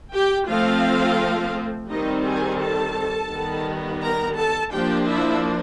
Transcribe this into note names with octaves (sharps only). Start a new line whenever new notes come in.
G4 G5
F3 A3 C4 F4 F5
D#3 G3 C4 D#4 D#5
G#4 G#5
A4 A5
D#3 G3 B3
A#4 A#5
A4 A5
F3 A#3 D4 G4 G5
E4 E5